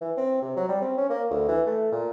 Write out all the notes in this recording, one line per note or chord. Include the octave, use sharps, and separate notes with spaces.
E3
C4
C3
F#3
G3
C4
C#4
A#3
D2
E3
A3
A#2